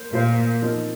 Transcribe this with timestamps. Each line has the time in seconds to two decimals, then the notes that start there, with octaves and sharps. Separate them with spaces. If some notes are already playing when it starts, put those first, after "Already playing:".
Already playing: A#3 C5
0.13 A#2 A#3 F4 C5 F5
0.62 F3 C4 D#4 A#4